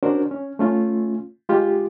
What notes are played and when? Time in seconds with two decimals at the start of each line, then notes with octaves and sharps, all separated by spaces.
0.03 C#4 D4 F#4 A#4 C5
0.31 C#4
0.59 A3 C#4 F4
1.49 G#3 F4 G4